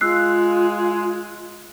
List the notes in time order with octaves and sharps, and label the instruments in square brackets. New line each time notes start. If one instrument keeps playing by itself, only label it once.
[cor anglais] G#3 [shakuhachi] F4 [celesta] E6 F#6 C7